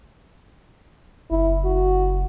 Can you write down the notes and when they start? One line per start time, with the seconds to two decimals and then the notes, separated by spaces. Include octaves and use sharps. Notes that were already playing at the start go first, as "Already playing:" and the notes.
1.31 F#1 E4
1.65 F#4